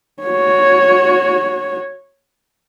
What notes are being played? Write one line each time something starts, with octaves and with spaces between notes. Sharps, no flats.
F#4 C#5